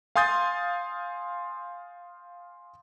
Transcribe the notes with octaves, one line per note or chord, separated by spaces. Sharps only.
F5 G#5 C6 D#6 G6 A6